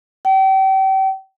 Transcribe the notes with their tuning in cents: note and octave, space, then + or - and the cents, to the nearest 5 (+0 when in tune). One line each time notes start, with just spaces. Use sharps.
G5 -35